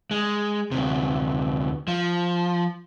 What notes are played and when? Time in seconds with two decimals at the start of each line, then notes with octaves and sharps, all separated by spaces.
0.11 G#3
0.71 D2 C3
1.88 F3